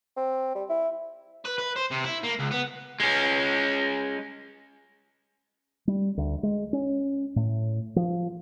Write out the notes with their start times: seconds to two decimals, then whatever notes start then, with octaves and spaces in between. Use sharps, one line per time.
0.17 C4
0.55 G3
0.69 E4
1.45 B4
1.58 B4
1.76 C5
1.91 C3
2.05 E4
2.24 A#3
2.39 C#2
2.51 B3
3.00 G#3 C#4
5.87 G3
6.17 D2
6.43 G#3
6.73 C#4
7.36 A2
7.96 F3